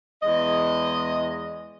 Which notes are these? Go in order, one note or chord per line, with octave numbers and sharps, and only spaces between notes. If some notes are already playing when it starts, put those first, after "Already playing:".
E2 G#3 D#5